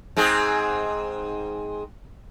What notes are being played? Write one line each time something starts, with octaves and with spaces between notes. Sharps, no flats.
G#2 C4 G#4